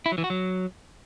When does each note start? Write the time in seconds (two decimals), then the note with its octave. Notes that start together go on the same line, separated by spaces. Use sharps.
0.06 E4
0.12 F#3
0.18 E3
0.24 F#4
0.30 F#3